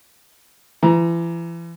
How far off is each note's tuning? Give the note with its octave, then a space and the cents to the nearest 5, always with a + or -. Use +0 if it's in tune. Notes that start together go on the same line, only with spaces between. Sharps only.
E3 +35 A#5 +20